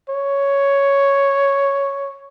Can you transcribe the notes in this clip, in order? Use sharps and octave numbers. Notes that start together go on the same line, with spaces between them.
C#5